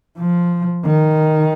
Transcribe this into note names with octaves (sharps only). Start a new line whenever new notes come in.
F3
D#3